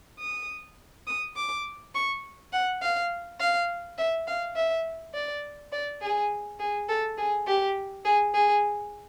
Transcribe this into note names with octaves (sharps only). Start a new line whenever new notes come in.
D#6
D#6
D6
C#6
F#5
F5
F5
E5
F5
E5
D5
D5
G#4
G#4
A4
G#4
G4
G#4
G#4